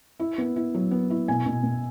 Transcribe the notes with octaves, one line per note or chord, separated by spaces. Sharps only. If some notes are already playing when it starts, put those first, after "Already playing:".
E4
B3
E4
F#3
B3
E4
B2 G#5
B2
B2